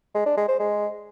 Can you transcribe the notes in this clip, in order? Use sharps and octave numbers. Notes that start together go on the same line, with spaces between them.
G#3
D4
G#3
C5
G#3